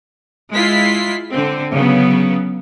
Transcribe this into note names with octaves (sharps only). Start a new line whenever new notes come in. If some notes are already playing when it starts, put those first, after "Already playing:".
G#3 E4 F4 B6 C7
D3 C4
C#3 F#3 B3